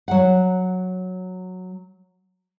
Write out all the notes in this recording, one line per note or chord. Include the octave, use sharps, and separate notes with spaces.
F#3 F#5